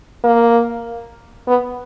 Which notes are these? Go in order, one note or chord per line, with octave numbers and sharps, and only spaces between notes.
A#3
B3